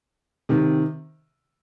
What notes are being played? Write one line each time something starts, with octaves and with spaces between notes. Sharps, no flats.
C3 D#3